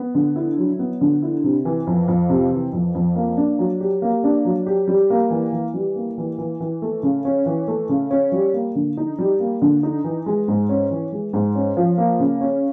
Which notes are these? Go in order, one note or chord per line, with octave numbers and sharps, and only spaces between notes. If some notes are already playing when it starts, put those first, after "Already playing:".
Already playing: B3
D3
E4
F#3
B3
D3
E4
C3
E3
F2
F2
C3
E3
F2
F2
A#3
D4
F#3
G4
A#3
D4
F#3
G4
G3
A#3
E3
E3
G3
A#3
E3
E3
E3
A3
C#3
C#4
E3
A3
C#3
C#4
G3
A#3
D3
D#4
G3
A#3
D3
D#4
E3
G#3
G#2
C#4
E3
G#3
G#2
C#4
F3
A#3
C#3
C#4